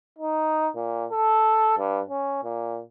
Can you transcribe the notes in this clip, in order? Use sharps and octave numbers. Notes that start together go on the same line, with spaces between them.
D#4
A#2
A4
G2
C#4
A#2